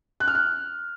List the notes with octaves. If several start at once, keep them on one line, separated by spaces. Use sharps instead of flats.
F#6
F6
F#6